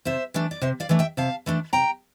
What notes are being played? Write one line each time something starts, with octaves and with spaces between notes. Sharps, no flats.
C3 C5 E5
E3 A3 D4
D5
C3 C5 E5
D5 F5
E3 A3 D4
E5 G5
C3 F5 A5
E3 A3 D4
C3 G5 A#5